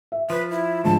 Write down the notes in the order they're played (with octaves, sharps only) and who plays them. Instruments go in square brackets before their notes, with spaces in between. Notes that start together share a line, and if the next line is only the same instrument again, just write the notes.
[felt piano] E5
[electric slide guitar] F3 [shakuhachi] B4
[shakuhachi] E4
[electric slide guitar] G#2 B2 [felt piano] D3 F3 G#3 [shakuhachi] A5